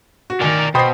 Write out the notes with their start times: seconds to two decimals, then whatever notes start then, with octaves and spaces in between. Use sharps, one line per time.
0.30 F#4
0.41 D#3 A#4 D5 G#5
0.75 B2 C5 G5 B5 D#6 C7